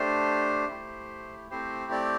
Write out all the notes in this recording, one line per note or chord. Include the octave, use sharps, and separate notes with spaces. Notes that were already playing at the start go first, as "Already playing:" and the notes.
Already playing: A3 D4 G4 C5
A3 E4 G4
A3 C4 E4 G4 C5
D5